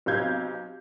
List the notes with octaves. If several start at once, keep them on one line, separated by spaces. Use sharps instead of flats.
B1 C3 F5 G6 G#6